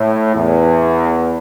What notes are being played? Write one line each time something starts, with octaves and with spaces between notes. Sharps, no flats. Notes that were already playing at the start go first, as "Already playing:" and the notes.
Already playing: A2
E2